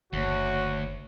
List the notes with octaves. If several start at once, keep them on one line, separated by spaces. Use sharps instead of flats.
F#1 D2 F#4 C#5